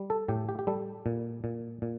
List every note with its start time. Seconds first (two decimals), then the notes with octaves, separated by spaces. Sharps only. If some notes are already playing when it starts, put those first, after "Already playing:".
Already playing: G3
0.10 A4
0.28 A2 G4
0.49 G4
0.59 G4
0.67 G3 A4
1.06 A#2
1.44 A#2
1.82 A#2